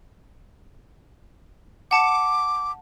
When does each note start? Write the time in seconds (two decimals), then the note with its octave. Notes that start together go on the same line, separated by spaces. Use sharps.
1.91 F#5 A5 D6 C#7